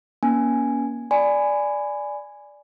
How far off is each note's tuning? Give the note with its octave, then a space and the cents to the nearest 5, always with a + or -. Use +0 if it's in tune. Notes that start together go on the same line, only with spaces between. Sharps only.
A#3 +35 C#4 +15 G#5 +0
D5 +0 G#5 +0 B5 +20